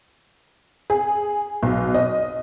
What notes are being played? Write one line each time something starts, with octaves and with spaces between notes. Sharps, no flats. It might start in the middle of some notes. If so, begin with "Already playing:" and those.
G#4
B1
D#5